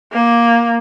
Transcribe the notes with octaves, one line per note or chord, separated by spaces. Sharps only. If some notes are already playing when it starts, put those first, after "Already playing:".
A#3